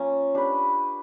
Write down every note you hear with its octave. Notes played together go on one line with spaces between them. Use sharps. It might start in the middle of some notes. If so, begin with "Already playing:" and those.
Already playing: F3 A#3 C#4 F4 C#5
D4 G4 B4